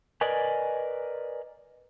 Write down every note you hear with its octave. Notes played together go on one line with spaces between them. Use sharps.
A#4 B4 D5 D#5 G#5